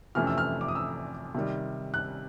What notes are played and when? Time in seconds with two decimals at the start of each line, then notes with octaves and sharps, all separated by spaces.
0.15 F2 C3 E3 A3 C#4 F6
0.27 E6
0.38 F6
0.61 D6
0.68 D#6
0.75 E6
1.35 C3 D#3 G3
1.94 F#6